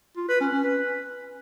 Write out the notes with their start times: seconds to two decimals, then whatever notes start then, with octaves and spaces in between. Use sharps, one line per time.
0.17 F4
0.29 B4
0.41 C#4
0.53 C#4
0.64 B4